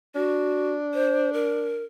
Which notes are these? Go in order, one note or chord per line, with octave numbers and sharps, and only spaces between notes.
D4 F#4
C5
A#4